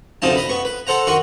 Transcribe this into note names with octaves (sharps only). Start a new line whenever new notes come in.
D2 C3 F3 D#4 A5
B4 D#5
B3 C#6
B4
A4 C5 F#5 A#5
D#3 F#4 C6 C#6